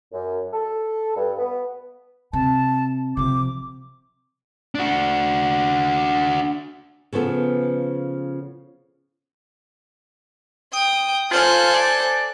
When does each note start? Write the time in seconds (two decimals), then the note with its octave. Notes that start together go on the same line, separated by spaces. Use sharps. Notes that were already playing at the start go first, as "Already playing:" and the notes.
0.13 F#2
0.53 A4
1.16 G2
1.38 B3
2.33 C3 A5
3.17 C3 F3 D6
4.75 D4 F#4
7.13 C#3 F3 B3 A4
10.73 G5 D#6
11.31 F4 A4 C5 G#5 F#6
11.74 D5